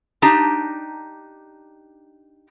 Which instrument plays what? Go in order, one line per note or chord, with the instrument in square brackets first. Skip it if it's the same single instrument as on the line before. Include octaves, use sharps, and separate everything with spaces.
[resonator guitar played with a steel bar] D4 D#4 G4 A5 A#5